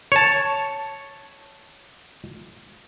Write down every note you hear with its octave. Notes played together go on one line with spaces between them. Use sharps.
C#5 A5